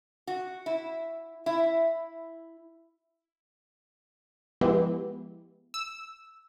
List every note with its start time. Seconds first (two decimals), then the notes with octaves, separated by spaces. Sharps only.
0.27 F#4
0.66 E4
1.46 E4
4.61 F3 G#3 B3 E4 G4
5.74 E6